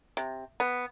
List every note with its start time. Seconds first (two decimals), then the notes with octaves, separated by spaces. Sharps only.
0.17 C3
0.60 B3